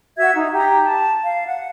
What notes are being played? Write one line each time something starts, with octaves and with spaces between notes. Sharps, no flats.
F#4 E5 F#5 G#6
D#4
G4 A#5
A5
F5
F#5